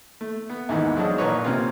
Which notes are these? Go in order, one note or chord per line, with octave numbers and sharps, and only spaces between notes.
A3
B3
D#2 G#2 E3 B3
F3 F#3 G#3 D4 D#5 A5
A1 A#2 A#4 B4 C#5 D#5
C3 A#3 C4 C#4 F4